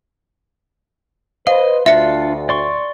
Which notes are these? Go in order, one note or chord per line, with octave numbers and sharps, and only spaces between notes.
B4 C5 D#5 F5
D2 D4 F4 E5 C#7
D5 C6 C#6